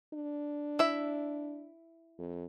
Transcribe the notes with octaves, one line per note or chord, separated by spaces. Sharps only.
D4
E4 E5
F2